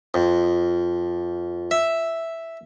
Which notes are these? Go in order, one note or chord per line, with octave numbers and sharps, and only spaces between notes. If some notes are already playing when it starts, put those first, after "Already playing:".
F2
E5